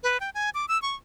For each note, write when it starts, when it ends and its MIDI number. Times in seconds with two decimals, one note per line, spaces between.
0.03 0.20 71
0.20 0.30 79
0.35 0.50 80
0.54 0.66 86
0.68 0.80 88
0.82 0.95 85